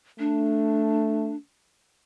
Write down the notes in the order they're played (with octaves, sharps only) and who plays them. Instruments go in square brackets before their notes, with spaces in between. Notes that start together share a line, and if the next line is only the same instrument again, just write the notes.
[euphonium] A3 [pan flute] D4